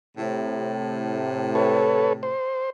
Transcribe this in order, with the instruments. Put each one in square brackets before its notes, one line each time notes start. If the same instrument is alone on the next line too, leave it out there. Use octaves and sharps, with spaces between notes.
[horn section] A2 C3
[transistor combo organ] A4 B4 C#5
C5